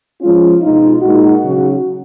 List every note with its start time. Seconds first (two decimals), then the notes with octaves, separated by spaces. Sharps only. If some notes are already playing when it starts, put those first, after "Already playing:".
0.22 F3 G#3 C#4 F4
0.61 B2 G#3 D#4 F4
1.02 A#2 G#3 D#4 F#4
1.43 C#3 F#3 C#4